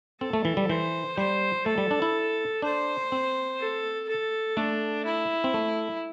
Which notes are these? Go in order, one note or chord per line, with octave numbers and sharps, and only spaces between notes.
C4 A4
A3
E3
G3
E3 C5
G3 C5
A3 A4
G3
D4
E4
D4 C5
C4
A4
A4
A3 D4
E4
C4
A3